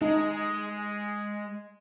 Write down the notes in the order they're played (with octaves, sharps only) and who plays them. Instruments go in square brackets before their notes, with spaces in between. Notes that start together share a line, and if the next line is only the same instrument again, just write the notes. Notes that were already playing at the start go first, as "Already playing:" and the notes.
[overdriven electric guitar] G#3 [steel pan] D#4